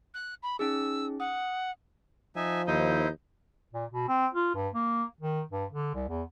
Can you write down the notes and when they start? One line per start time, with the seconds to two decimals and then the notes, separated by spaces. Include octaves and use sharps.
0.14 F#6
0.43 B5
0.59 C#4 D#4 G#4 E6
1.20 F#5 D#6
2.36 F3 D#4 E5 G#5
2.67 D#2 D#4 E4 C5
3.74 A#2
3.91 B2
4.09 C4
4.34 F4
4.55 G2
4.74 A#3
5.21 D#3
5.51 G2
5.72 D3
5.94 C2
6.08 E2